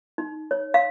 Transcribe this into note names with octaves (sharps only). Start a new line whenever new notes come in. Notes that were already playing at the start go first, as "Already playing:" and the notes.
D#4
C#5
F5